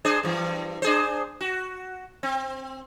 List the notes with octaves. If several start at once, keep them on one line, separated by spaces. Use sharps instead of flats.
D4 G#4 C5
G2 E3
D4 G#4 C5
F#4
C4